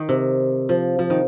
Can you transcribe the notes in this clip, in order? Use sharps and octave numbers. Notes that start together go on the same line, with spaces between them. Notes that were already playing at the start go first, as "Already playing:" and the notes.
Already playing: D#3
C3
F3
F3
D#3